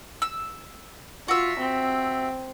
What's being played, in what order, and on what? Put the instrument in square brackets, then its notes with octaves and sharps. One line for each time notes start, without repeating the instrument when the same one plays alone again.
[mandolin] E6
[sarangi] F4 [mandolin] F#4 E5
[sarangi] C4